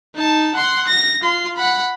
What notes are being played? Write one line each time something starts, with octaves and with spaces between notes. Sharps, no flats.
D#4 A5
F#5 C6
A#6
F4 C6
F#5 B5